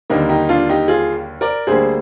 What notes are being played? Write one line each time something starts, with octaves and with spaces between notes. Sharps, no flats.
D#2 D3 G3 A#3 D#4
D#4 G4
D4 F4
D#4 G4
F4 G#4
A#4 D5
D2 D3 G3 A#3 G#4 C5